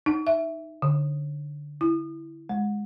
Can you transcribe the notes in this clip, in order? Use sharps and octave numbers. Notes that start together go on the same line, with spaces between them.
D#4
E5
D3
E4
G#3